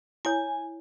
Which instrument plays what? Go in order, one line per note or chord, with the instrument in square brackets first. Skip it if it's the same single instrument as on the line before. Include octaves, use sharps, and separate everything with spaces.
[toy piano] E4 C#5 [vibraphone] G#5